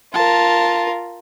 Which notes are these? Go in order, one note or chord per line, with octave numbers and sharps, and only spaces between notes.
F4 A#4 A5